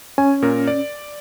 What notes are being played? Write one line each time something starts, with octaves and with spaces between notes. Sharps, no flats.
C#4 G#5
A#2 A#4
D5